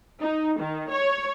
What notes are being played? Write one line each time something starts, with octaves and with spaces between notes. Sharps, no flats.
D#4
D#3
C#5